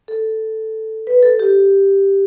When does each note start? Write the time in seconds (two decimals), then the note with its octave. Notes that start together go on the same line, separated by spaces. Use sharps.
0.08 A4
1.07 B4
1.23 A4
1.39 G4